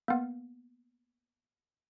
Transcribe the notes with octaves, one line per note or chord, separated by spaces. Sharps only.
A#3 B3